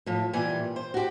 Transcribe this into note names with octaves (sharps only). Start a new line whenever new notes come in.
A2 F3
A#2 E3 G3 G#5
C5
F#4 G4